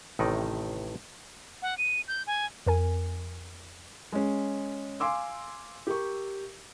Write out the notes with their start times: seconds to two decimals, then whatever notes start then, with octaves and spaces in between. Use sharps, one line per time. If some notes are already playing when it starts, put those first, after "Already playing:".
0.19 A1 A2 C3 D#3 D#4 D5
1.62 F#5
1.78 D#7
2.08 G6
2.27 G#5
2.66 F2 A#4 G#5
4.12 G#3 C#4
5.00 F5 G#5 C6 D6 E6
5.87 G4 A#4 C#6